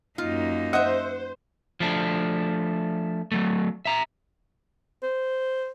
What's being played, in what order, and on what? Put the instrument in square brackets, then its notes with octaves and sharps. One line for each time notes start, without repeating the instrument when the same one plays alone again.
[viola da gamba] F#2 A#3 D#4 [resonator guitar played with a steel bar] F4
[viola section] C5 [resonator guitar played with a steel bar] D#5 E5 [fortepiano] F#5
[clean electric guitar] F3 A3 D4
F#3 A3
E5 A#5
[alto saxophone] C5